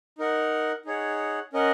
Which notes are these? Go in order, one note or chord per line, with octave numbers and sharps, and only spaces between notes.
D#4 A#4 F#5
D#4 G#4 C#5 F#5
C#4 A#4 D#5 F#5